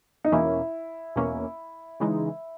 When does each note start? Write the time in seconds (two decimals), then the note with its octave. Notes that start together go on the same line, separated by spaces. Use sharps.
0.25 D#4
0.32 E2 B2 A#3 C#4 E4
1.16 E2 B2 A#3 C#4
2.00 C#3 E3 G#3 D#4